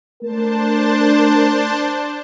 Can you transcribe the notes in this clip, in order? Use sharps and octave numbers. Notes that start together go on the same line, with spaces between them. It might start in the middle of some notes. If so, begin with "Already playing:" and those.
A3 D4 A#4 C5 A5